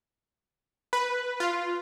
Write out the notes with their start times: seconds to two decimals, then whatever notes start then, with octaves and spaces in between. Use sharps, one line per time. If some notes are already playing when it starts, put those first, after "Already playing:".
0.93 B4
1.40 F4